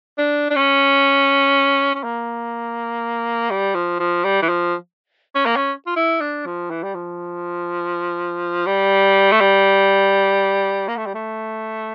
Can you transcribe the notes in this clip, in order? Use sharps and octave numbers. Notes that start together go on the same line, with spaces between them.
D4
D4
C#4
C#4
A#3
G3
F3
F3
G3
E3
F3
C#4
A#3
C#4
F4
E4
D4
F3
E3
G3
F3
G3
A3
G3
A#3
A3
G3
A3